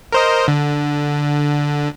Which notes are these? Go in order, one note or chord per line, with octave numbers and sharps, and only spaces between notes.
A#4 C5 D#5
D3